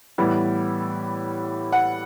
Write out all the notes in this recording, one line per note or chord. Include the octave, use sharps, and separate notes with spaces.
A2 E3 G3 B3 E4
F#5